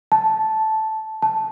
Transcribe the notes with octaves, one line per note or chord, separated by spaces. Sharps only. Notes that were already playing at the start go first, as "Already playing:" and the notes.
A5
A5